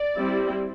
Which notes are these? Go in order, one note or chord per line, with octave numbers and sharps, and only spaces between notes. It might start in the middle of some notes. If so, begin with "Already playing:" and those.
Already playing: D5
G3 C4 E4